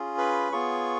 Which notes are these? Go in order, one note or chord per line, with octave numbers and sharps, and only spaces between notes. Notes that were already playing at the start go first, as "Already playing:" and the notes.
Already playing: C#4 F4 G#4
B4 B5
B3 F4 G#4 C#5 C#6